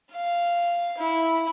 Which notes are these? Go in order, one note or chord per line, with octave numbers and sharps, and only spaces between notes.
F5
E4